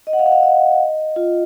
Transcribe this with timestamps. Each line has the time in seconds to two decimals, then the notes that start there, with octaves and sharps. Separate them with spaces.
0.07 D#5
0.13 F#5
0.19 F5
0.26 F#5
0.32 F5
0.43 D#5
1.16 F4